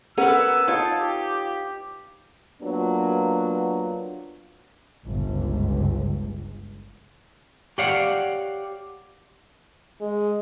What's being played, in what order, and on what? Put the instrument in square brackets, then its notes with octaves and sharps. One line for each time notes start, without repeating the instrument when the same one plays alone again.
[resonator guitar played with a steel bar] B3 C#4 [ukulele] A4 A#4 F#5 [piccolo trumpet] E6
[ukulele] D#4 C#5 [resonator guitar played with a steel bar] F4 [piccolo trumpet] A4
[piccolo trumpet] G4
[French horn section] F#3 A#3 B3 D4 F4 F#4
[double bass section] G1 C#2
[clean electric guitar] G4 C#5 D5 F5 F#5
[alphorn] G#3